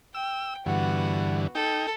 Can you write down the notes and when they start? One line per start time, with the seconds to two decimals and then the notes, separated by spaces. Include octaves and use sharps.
0.15 G5 E6
0.66 G2 D3 E3 B3 F#4
1.55 D#4 A4 G5